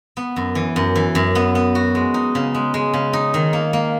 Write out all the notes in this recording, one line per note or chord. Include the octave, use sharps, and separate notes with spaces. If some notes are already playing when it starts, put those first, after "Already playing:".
B3
F#2
E3
F#2
E3
F#2
B3
B3
F#4
G#3
D#4
C#3
G#3
G#3
C#3
D#4
D#3
A#3
A#3